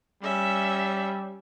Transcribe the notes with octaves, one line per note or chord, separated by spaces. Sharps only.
G3 C#4 E5